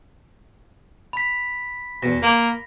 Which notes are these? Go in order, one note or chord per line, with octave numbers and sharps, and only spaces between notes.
B5 B6
E2 B2 A#6
A#3 F5 C6